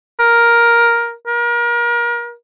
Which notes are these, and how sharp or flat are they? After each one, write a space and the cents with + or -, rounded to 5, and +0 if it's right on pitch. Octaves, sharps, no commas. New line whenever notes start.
A#4 +10
A#4 +35